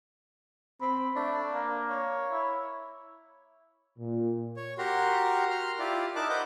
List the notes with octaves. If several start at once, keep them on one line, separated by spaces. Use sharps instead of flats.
C4 B5
A3 D4
A#3
C#5
E4
A#2
C#5
F#4 G4 A#4 A#5 C6
A#5 C6 F6
E4 F4 G4 D5
D#4 E4 A#4 A5 D6 F#6
B4 C5 D#5 F#5 D6 G6